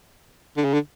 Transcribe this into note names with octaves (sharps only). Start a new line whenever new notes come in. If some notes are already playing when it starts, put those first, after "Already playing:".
D3
C#3
D3